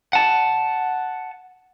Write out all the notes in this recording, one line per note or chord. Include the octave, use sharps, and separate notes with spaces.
F#5 A5